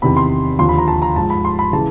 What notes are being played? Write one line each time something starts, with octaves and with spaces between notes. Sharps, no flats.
E2 C3 D#3 B5
C6
D#2 D3 F3 C6
B5
A#5
A5
A#5
G#2 F3 A5
B5
C6
B5
C#3 E3 A5